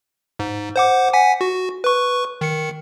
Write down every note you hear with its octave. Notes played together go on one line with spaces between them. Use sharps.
G#2
C5 F#5 D6
F#5 G#5 B6
F#4
B4 C#6
D#3 C#7